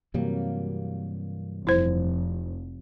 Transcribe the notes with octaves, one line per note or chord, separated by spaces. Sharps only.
G2 C3 E3 F#3 G3 A#3
F1 E4 C5